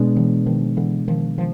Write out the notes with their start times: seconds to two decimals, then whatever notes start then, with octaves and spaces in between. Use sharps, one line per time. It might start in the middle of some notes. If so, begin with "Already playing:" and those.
Already playing: B2 G#3 B3 D4
0.16 E3 F#3
0.46 D#3 F3
0.77 D3 E3
1.08 D#3 F3
1.38 D#3 F3